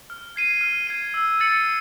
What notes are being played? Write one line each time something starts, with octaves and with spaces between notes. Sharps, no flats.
F6
G#6 C7 D#7
F6
G#6 C7 D#7
E6
A6 C#7 F#7